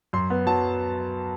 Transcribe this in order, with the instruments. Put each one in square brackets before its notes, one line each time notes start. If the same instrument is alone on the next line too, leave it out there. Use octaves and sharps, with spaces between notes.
[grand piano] F#2 C6
B3
F#3 A5